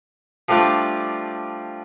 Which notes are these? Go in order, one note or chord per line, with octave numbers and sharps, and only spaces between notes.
F3 G3 A3 D4 F4 D5